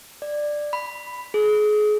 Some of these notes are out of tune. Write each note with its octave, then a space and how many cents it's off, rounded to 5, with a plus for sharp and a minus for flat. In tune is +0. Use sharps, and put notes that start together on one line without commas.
D5 +10
B5 +5
G#4 +30